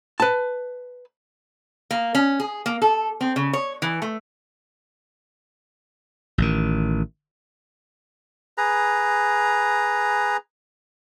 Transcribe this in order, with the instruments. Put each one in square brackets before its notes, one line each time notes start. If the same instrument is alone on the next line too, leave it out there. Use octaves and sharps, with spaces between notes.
[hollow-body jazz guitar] B4 A5
[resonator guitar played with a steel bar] A#3
C#4
G#4
A#3
A4
C4
C#3
C#5
E3
A3
[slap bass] A1 D#3
[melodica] G#4 B4 A#5